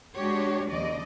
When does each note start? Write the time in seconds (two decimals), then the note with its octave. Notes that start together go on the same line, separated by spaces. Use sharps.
0.15 G#3 D4 F#4 G4 C#5
0.71 D#2 C#3 F3 D5 D#5